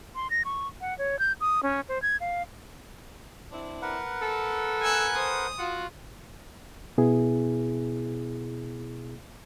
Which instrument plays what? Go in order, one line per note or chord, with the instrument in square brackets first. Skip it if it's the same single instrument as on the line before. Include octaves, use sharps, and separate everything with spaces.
[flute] C6
A#6
C#6
F#5
C#5
G6
D#6
C#4
C5
G#6
F5
[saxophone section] C4 D4 E4
[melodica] A#4 B4 F#5
[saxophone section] A4
[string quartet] G#5 E6 F#6
[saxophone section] A4 C5 [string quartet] D#6
[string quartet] F4 [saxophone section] F#4
[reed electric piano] B2 B3 E4 G#4